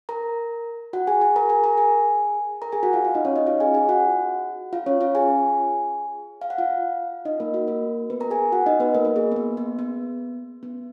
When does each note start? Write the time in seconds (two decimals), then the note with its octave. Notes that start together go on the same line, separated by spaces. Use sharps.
0.09 A#4 A#5
0.93 F#4 F#5
1.07 G#4 G#5
1.21 G#4 G#5
1.36 A#4 A#5
1.49 G#4 G#5
1.64 A#4 A#5
1.77 G#4 G#5
2.62 A#4 A#5
2.72 G#4 G#5
2.83 F#4 F#5
2.93 F4 F5
3.04 F4 F5
3.15 D#4 D#5
3.25 C#4 C#5
3.36 D#4 D#5
3.46 F4 F5
3.60 G#4 G#5
3.74 G#4 G#5
3.89 F#4 F#5
4.73 F4 F5
4.86 C#4 C#5
5.01 F4 F5
5.15 G#4 G#5
6.41 F5
6.50 F#5
6.58 F4 F5
7.25 D#4 D#5
7.40 A#3 A#4
7.54 F#4
7.67 A#3 A#4
8.10 B3 B4
8.20 A#4 A#5
8.31 G#4 G#5
8.52 F#4 F#5
8.66 D#4 D#5
8.80 B3 B4
8.95 A#3 A#4
9.05 A#3 A#4
9.16 G#4
9.32 B3
9.36 A#3
9.57 B3
9.79 B3
10.63 B3